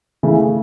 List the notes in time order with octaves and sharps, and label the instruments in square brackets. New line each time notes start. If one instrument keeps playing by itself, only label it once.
[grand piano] C#3 E3 A3